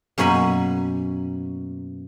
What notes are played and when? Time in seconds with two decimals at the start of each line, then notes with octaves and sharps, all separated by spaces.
0.18 F#2 B2 A#3 G#5 B5